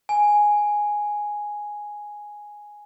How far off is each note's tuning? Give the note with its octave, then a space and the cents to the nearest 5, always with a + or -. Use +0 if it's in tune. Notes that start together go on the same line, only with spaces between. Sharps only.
G#5 +0